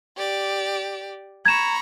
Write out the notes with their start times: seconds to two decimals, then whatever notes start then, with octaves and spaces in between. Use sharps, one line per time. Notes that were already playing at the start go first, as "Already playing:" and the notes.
0.16 G4 D5
1.46 A#5 B5 C#6 G#6 E7